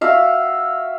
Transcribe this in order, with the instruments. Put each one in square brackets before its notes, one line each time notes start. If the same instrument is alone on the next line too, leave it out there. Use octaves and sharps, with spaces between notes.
[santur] F#4 E5 F5